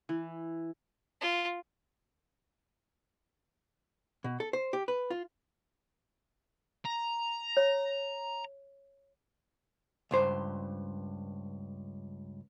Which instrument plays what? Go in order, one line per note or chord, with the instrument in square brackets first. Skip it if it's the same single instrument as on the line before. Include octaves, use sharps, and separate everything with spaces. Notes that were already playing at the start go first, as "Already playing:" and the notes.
[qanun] E3
[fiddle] F4
[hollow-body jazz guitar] B2
A4
C5
G4
B4
F4
[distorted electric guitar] A#5
[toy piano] C#5
[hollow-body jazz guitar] C#2 G2 C5